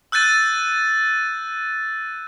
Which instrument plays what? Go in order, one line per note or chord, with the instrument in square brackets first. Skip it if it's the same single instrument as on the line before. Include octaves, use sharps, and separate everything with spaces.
[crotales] E6 F#6 G6 A6 D#7